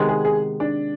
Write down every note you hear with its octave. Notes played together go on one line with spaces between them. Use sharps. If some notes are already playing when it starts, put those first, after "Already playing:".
Already playing: C3 D#3 G#3 B3
G#4
G#4
D4